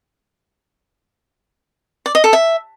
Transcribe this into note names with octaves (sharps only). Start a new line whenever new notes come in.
D5
D#5
A4
E5